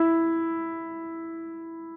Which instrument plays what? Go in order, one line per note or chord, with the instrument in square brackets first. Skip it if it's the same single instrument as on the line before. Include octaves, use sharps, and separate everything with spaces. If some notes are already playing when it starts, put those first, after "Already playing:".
Already playing: [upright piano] E4